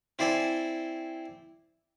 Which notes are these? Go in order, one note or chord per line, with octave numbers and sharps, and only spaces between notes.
C4 E4 C5 D5 G#5